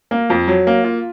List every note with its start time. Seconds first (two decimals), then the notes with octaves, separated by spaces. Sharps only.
0.11 A#3
0.30 F2
0.48 F#3
0.67 A#3
0.84 F4